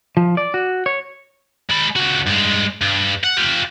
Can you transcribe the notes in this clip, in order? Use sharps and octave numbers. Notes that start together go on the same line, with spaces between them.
F3
D5
F#4
C#5
G#3 B5
C#2 F#4
G2 G#3
G2
F#5
F4 G4